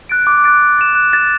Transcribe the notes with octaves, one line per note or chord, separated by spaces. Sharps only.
F#6 A6 D7
D6
F#6 A6 D7
F#6
A6 E7
F#6
A6 E7